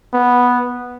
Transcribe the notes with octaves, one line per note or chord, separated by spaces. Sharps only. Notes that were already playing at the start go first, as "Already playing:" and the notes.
B3